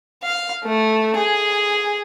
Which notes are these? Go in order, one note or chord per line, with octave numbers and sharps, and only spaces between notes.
F5
A3
G#4